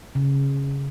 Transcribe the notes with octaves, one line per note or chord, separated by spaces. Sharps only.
C#3